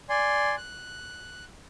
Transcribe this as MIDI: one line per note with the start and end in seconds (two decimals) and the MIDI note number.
0.09 0.56 74
0.09 0.56 80
0.09 0.56 84
0.58 1.45 90